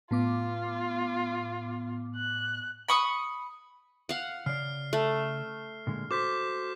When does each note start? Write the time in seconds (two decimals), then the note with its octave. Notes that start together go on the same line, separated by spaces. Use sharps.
0.11 A2 B3 F4 D6
2.16 F#6
2.89 B5 C#6 D#6
4.09 F5 F#5
4.46 C#3 D5 F6 C7
4.93 A3
5.87 A#2 D3 G#3
6.11 F#4 A4 C5 D6 G6 B6